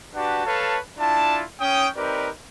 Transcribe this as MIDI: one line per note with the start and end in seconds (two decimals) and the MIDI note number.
0.15 0.43 62
0.15 0.43 66
0.15 0.43 67
0.15 0.43 71
0.15 0.43 78
0.15 0.43 81
0.45 0.78 69
0.45 0.78 71
0.45 0.78 73
0.45 0.78 77
0.45 0.78 81
0.98 1.43 62
0.98 1.43 64
0.98 1.43 65
0.98 1.43 81
1.61 1.87 61
1.61 1.87 79
1.61 1.87 87
1.96 2.29 60
1.96 2.29 63
1.96 2.29 67
1.96 2.29 70
1.96 2.29 71
1.96 2.29 74